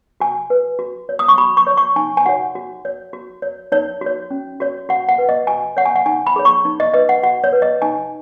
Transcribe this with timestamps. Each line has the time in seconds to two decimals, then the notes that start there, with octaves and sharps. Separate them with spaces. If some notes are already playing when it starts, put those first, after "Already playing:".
0.20 F#4 G#5
0.50 B4
0.79 F#4
1.09 C#5
1.19 D#6
1.28 C#6
1.38 F#4 B5
1.57 C#6
1.67 C#5
1.77 C#6
1.96 D#4 G#5
2.17 G#5
2.26 F#4 C#5 F#5
2.55 F#4
2.85 C#5
3.13 F#4
3.42 C#5
3.72 D#4 C#5
4.01 F#4 C#5
4.31 C#4
4.60 F#4 C#5
4.89 F#4 F#5
5.09 F#5
5.18 B4
5.29 D#5
5.47 F#4 G#5
5.77 C#5 F#5
5.85 G#5
5.96 F#5
6.06 D#4 G#5
6.27 B5
6.36 G#4 C#5
6.45 C#6
6.65 D#4
6.80 D#5
6.94 B4 D#5
7.09 F#5
7.23 F#4 F#5
7.44 C#5
7.53 B4
7.62 D#5
7.82 D#4 G#5